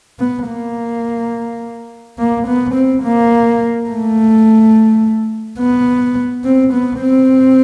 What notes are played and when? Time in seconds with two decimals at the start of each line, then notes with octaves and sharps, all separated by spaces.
0.19 B3
0.48 A#3
2.18 A#3
2.47 B3
2.75 C4
3.03 A#3
3.89 A3
5.59 B3
6.44 C4
6.73 B3
7.01 C4